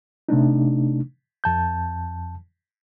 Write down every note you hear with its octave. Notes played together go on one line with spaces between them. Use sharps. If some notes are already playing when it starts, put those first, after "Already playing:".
C3 A3 D4 D#4
F2 A5 G6